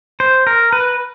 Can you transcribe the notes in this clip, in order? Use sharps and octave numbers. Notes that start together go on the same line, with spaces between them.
C5
A#4
B4